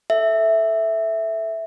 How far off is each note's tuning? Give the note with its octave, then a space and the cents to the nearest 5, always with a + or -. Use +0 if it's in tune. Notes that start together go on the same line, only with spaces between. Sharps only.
A4 +0 E5 +0